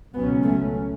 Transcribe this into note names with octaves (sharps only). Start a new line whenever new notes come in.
C#2 B2 F#3 B3 C#4
A3